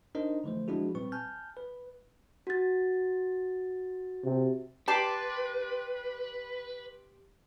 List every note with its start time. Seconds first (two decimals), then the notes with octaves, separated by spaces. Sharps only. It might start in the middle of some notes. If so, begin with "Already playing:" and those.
0.15 D4 D#4 A#4 C5 D#5
0.44 D3 E3 F3 A3 C5
0.68 F3 G#3 D4 E4 F#4 G#4
0.95 A#2 G3 C4 B4 C#6
1.12 G#5 A5 F6 G6
1.57 B4
2.47 F#4 A6
4.24 C3
4.88 G4 B4 D5 A5 C6 D6